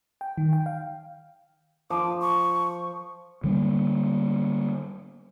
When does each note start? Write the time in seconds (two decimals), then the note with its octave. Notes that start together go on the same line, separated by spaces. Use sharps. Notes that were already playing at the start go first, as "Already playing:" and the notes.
0.21 G5
0.38 D#3
0.53 G5
0.66 F5
1.90 F3 D6
2.20 C#6
3.44 D3 G3 A3 A#3